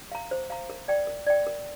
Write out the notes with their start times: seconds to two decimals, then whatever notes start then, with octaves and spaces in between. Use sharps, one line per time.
0.12 F5 A#5
0.31 C5
0.50 F5 A#5
0.70 A#4
0.88 D5 G5
1.07 A#4
1.26 D5 G5
1.46 A#4